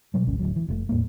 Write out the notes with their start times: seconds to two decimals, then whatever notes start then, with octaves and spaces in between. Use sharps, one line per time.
0.14 B2 F#3 G3
0.27 G#1 D2 C#4
0.39 D1 D2 F#3
0.56 E3
0.68 F1 A#2 A3
0.89 E2 A2 G3 A#3